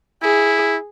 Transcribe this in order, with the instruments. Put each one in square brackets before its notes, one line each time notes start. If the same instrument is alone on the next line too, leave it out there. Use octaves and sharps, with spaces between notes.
[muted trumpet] E4 [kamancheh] G#4